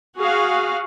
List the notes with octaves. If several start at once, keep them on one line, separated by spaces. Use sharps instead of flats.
F#4 G#4 F5